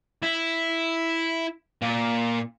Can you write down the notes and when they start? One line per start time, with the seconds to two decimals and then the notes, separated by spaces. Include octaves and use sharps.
0.22 E4
1.82 A#2